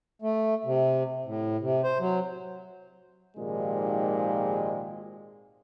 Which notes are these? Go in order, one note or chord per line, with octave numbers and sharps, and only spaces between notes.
A3
C3
A2
C3
C5
F#3
G#1 A#2 D#3 F3 G#3 G4